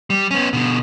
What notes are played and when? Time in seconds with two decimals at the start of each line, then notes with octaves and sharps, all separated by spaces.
0.10 G3
0.31 B3 C#4
0.53 B2 D3